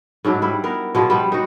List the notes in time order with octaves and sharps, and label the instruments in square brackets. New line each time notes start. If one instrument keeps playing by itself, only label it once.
[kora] G#2 F#3 D4 E4
G3 E4
B3 A#4
B2 F3 G#4
G3 B3 B4 C5
D#4 F#4